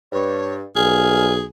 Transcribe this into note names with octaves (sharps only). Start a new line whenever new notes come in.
G2 C#5
B1 G3 A#3 G#4 G#5 F6